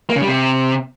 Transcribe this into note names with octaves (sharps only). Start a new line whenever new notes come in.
A#3
C#3
G3
C3